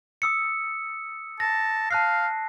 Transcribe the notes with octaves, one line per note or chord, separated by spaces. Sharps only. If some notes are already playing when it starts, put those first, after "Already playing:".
D#6 E6 C#7
A5 A#6
F5 A5 F#6 C7